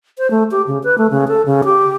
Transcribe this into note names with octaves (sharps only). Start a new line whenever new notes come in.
C5
A3
G4
C#3
B4
A3
C#3
A4
C#3
G4